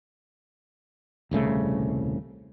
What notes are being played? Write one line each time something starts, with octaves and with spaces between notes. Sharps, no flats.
D#1 C2 C#3 A3